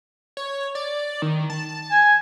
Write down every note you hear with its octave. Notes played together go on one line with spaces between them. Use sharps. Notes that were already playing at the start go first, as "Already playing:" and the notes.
C#5
D5
D#3
A5
G#5